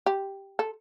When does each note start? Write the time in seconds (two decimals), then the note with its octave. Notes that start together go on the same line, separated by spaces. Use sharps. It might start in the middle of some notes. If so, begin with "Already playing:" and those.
0.06 G4
0.59 A4